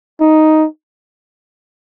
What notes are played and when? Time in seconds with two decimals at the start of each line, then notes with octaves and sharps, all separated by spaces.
0.21 D#4